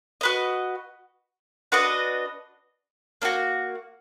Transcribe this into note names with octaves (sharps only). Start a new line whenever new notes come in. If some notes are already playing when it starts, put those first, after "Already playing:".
F#4 B4 D#5
D4 F#4 B4 D#5
A#3 D4 F#4